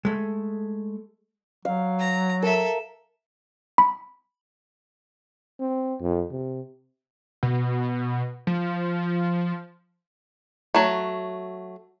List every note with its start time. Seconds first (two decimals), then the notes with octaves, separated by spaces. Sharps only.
0.05 G#3 A3
1.65 F#3 F5
1.99 A#5
2.43 A4 A#4 E5
3.78 B5
5.60 C4
6.00 F2
6.31 C3
7.43 B2
8.47 F3
10.74 F#3 A3